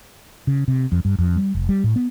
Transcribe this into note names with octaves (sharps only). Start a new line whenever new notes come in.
C#3
C3
F2
G2
F2
G3
F1
G3
A2
B3